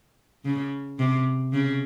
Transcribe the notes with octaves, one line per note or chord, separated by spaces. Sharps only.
C#3
C3
C#3